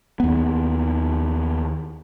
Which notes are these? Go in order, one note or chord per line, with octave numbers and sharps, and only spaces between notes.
D#2 B3